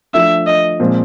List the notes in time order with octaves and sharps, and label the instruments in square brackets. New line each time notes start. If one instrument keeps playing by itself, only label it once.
[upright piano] F3 A3 D4 [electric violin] E5
[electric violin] D#5
[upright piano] A#2 F3 G#3 C4